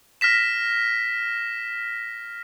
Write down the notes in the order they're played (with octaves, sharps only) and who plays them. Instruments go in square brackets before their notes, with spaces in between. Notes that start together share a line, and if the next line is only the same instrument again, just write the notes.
[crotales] F6 A#6 B6 E7